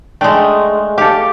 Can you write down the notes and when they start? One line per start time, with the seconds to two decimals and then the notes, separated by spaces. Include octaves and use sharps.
0.21 G#3 A3 D4 G5
0.98 G4 A4 F5